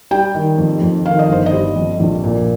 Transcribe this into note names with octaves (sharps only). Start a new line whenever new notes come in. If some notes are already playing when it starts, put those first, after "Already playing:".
G3 G5
D#3
F2
F2
D#3 F5
D#5
G1 C5
D#5
G3
F2
A#1
A#2